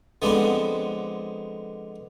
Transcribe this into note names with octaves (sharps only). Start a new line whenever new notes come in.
D3 F3 G#3 B3 C4 D4